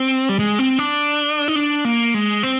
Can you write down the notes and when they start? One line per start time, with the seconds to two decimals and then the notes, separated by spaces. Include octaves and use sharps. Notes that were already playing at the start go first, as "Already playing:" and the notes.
Already playing: C4
0.29 G3
0.39 G#3
0.59 C4
0.79 D4
1.48 D#4
1.56 D4
1.85 A#3
2.14 G#3
2.43 C4